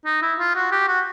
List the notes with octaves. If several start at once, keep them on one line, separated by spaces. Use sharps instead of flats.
D#4
E4
F4
F#4
G4
F#4